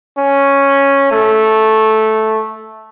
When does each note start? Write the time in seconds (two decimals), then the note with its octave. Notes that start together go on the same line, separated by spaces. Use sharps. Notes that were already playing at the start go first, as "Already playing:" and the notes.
0.18 C#4
1.11 A3